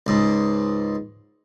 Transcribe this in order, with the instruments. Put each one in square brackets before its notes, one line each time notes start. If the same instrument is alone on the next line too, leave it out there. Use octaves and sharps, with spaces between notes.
[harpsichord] C#2 G#2